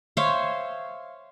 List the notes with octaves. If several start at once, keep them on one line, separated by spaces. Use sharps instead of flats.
C5 C#5 E5 F5